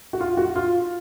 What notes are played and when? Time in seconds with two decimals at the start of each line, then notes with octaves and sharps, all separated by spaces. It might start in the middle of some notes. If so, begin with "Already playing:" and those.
0.13 F#4
0.21 F4
0.37 F#4
0.56 F4